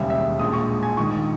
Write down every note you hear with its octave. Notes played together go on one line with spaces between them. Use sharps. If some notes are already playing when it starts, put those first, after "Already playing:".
Already playing: E1 D#2 C#3 G3 E5
E5
A#1 A#2 G#3 D#6
C#6
G#5
A#1 G#2 D#3 C#6